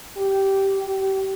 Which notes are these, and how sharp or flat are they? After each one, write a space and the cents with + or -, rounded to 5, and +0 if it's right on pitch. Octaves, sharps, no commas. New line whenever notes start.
G4 -10
G4 -30